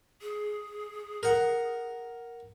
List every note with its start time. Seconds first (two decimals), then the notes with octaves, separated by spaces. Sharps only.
0.22 G#4
1.23 A#4 F#5